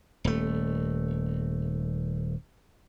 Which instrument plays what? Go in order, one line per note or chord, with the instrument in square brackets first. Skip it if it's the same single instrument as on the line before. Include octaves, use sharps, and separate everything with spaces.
[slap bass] D#1 A3